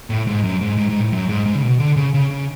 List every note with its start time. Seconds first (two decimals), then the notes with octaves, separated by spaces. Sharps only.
0.10 A2
0.27 G#2
0.43 F#2
0.61 G#2
0.78 G#2
0.90 G#2
1.00 A2
1.12 F#2
1.29 G#2
1.46 G#2
1.55 C#3
1.62 B2
1.80 D3
1.96 C#3
2.14 C#3
2.30 C#3